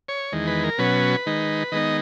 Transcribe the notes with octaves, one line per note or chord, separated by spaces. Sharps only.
C#5
E2 D#3 G#3
B4
A#4
B2 F#3 C#4 B4
D#3 G#3 D#4
D#3 G#3 B3 D#4 D#5